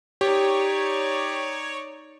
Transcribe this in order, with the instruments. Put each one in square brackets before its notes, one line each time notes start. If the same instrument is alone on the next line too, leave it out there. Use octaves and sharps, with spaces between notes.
[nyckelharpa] D#4 D5 [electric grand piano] G4 [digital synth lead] C#5